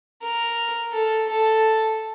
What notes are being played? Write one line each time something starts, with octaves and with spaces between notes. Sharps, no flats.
A#4
A4
A4